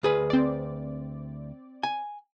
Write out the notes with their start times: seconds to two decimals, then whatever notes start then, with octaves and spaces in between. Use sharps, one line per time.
0.03 D2 G#4 B4
0.30 C4 D5
1.83 G#5